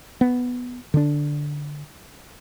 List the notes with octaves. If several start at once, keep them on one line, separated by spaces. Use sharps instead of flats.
B3
D3 D4